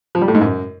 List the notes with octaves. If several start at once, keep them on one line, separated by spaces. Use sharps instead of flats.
F3
G3
A2
G#2
F#2